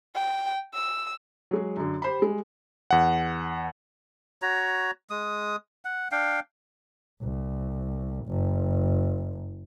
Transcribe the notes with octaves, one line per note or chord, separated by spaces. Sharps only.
G5
E6
F#3 G#3 G#4
F#2 D3
G4 C5 B5
G3 G#3
E2 F#5
F#4 C#5 A#5
G#3 D#6
F#5
D4 F5 G5
C2
F#1